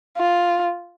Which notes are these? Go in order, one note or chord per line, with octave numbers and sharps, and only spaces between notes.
F4